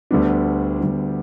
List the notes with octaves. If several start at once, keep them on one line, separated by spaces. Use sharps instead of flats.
D2 D3 G3 B3 D4
D2 D3 G3 B3 D4